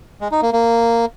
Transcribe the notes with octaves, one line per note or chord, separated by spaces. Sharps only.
G#3
D#4
A#3
A#3